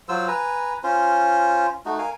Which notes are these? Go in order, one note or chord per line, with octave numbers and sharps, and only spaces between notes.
F#3 F4 C5 E6
B4 G#5 A#5
C#4 F4 C5
A3 D#4 F#4
A#4 F5 G#5